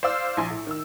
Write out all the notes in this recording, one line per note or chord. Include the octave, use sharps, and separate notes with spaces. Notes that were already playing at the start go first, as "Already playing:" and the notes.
C5 D5 F5 E6
A#1 G#5 C6
A2
D#3 E6